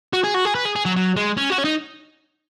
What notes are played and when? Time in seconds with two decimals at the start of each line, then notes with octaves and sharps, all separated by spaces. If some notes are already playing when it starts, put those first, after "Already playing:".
0.13 F#4
0.24 G#4
0.34 F#4
0.45 G#4
0.55 B4
0.65 G#4
0.75 G#4
0.85 F#3
0.96 F#3
1.17 G#3
1.37 C#4
1.50 F#4
1.58 C#4
1.64 D#4